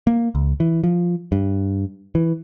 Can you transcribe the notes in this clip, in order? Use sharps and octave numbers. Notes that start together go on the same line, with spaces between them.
A#3
C#2
E3
F3
G2
E3